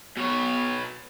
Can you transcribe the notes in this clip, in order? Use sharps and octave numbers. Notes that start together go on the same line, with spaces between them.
B2 C#5